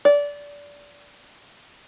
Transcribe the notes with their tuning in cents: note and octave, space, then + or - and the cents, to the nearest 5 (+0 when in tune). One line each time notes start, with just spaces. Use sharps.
D5 -20